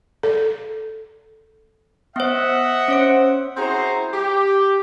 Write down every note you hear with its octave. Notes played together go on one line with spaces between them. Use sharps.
A4
B3 C5 D#5 E5 F#5
C#4 C5 C#5 D7
C4 E4 F#4 G#4 C5 A#5
G4